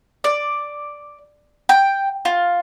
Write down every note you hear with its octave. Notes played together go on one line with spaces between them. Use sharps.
D5
G5
F4